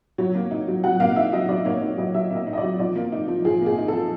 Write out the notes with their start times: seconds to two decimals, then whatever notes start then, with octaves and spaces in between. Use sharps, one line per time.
0.18 F#3 C#5
0.35 A#3
0.51 D#4
0.68 F#3
0.84 F#3 F#5
1.00 A#3 F5
1.16 D#4 E5
1.33 F#3 D#5
1.49 F#3 D5
1.65 A#3 C#5
1.81 D#4 C#5
1.97 F#3 D#5
2.14 F#3 E5
2.31 A#3 D#5
2.47 D#4
2.53 D#5
2.58 D5
2.63 F#3
2.79 F3 D5
2.95 A#3
3.12 D#4
3.28 F3
3.45 F3 G#4
3.61 A#3 G#4
3.78 D#4
3.88 A4
3.94 F3